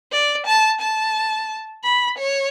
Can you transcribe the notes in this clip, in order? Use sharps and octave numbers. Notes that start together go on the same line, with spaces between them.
D5
A5
A5
B5
C#5